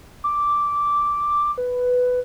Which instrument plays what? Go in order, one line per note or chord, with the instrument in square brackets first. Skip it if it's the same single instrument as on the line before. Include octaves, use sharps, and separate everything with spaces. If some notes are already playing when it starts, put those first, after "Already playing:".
[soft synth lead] D6
B4